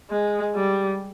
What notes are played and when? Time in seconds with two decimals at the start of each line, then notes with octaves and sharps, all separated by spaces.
0.11 G#3
0.55 G3